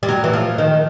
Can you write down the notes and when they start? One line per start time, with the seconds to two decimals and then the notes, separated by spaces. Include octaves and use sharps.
0.03 G3
0.08 F#3
0.24 E3
0.34 F3
0.58 D#3